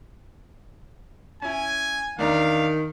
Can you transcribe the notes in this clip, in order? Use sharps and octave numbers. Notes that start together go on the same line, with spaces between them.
C#4 E4 G#5
E2 D#3 D4 F5 A#5